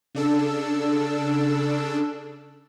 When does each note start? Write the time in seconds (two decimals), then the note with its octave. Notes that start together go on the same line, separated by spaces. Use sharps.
0.15 C#3 D4 A4 E6